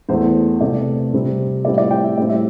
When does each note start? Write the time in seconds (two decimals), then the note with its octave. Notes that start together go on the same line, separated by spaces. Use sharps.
0.09 E2 E3 A3 C5
0.61 C3 A3 C4 D5
1.13 C3 G3 C4
1.65 A2 G3 C4 D5
1.78 D5
1.91 G5
2.04 E5
2.17 A2 G3 C4 D5
2.29 E5